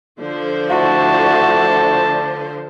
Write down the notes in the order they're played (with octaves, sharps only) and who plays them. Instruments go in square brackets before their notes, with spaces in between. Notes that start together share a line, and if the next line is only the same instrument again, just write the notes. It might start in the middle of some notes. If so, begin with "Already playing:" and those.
[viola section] D3 F3 C5
[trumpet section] A3 D4 A5 [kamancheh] E4 F#4